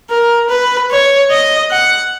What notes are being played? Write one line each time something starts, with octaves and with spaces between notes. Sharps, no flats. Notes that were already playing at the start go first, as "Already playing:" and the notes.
A#4
B4
C#5
D#5
F#5